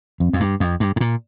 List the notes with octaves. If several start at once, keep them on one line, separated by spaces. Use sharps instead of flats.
F2
F2
G2
F2
G2
G#2
A#2